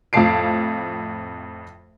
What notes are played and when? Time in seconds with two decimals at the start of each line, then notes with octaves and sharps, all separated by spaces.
0.13 F2 A2 F5 A5 C7 D7